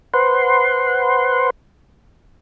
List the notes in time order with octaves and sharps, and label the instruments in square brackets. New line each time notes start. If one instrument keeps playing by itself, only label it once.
[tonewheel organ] B4 C5 F#5 C6